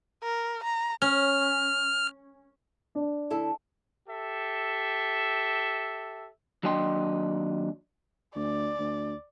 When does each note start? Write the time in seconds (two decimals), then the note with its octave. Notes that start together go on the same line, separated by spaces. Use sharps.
0.23 A#4
0.64 A#5
1.02 C#4 F6
2.95 D4
3.30 D2 E4 A4
4.08 G4 A4 E5
6.63 D#2 F#3 D4 D#5 G5 C6
8.35 D2 D5
8.79 D2